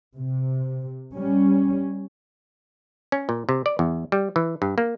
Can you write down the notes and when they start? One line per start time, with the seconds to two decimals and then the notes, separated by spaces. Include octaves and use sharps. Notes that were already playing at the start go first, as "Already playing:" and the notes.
0.18 C3
1.13 G3 C#4
3.12 C#4
3.29 A#2
3.49 C3
3.66 D5
3.79 E2
4.12 G3
4.36 E3
4.62 G2
4.78 A#3